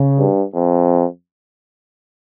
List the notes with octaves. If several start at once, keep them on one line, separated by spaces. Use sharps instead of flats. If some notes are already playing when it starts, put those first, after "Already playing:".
Already playing: C#3
G2
F2